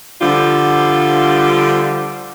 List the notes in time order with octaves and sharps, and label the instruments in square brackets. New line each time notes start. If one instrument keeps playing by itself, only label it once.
[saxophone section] D3 F3 G3 D4 F4